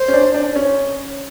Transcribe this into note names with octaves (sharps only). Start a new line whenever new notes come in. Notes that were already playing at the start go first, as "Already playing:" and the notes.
Already playing: C5
C#4
D4
D4
C#4